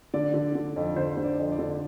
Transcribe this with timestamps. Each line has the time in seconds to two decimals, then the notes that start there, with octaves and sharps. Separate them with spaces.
0.14 D3 D5
0.34 D3
0.55 D3
0.76 F2
0.96 D3 C5
1.17 D3
1.24 D5
1.38 F2
1.52 D5
1.59 D3